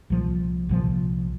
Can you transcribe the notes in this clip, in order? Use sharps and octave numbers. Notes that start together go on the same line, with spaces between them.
C2 A#2 F3
C2 A#2 F3